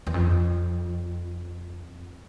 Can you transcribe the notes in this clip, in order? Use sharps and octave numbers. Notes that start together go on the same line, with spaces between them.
E2
F2